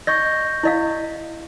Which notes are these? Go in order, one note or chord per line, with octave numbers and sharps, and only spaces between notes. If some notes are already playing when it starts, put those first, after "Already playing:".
D#5 C#6 G6 A#6
E4 D#5 F5